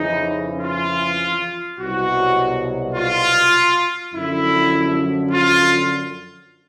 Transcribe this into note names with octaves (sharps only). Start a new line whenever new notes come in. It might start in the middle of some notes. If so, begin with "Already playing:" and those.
Already playing: F2 C#3 E3 D#4
F4
C2 B2 F#3 F#4
F4
F#2 D3 F3 E4
F4